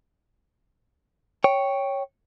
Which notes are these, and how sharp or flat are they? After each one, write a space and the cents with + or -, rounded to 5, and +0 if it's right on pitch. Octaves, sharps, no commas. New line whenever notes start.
C#5 +0 G5 +0